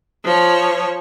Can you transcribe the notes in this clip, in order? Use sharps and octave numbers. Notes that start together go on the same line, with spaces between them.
F3 C#5